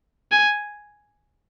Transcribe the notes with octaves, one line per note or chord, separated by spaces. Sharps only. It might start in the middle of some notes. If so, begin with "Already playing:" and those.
G#5